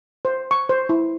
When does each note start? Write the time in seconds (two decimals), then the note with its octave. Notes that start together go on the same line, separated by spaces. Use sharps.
0.25 C5
0.51 C#6
0.69 C5
0.89 E4